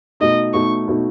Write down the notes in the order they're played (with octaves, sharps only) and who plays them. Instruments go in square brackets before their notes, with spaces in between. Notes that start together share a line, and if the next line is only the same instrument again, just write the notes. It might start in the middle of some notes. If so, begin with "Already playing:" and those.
[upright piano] B2 A3 D#4 [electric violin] D#5
[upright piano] B2 A3 D#4 [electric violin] C#6
[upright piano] B2 A3 D#4